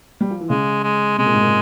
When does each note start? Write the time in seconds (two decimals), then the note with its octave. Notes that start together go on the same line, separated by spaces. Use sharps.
0.21 G3
0.30 F3
0.40 E3
0.50 C#3 G#3
0.84 G#3
1.18 C3 G#3
1.26 A#2
1.34 G#2
1.42 A#2